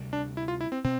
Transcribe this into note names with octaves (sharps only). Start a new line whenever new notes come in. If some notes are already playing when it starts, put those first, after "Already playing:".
Already playing: D2 C3 G3
D4
E4
F4
E4
C4
B2 C4